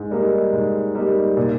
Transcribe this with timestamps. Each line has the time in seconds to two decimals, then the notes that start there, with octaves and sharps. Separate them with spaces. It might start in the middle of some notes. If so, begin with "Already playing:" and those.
Already playing: G#2
0.11 G3 A#3 D#4
0.52 G#2
0.95 G3 A#3 D#4
1.37 A#2